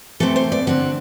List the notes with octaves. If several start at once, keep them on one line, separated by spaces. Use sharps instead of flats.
E3 A3 C4 A4
C5
D5
D3 A3 C4 F#5